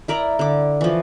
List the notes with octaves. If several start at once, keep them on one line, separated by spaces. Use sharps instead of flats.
E4 A#4 D5 A#5
D3 D6
E3 F3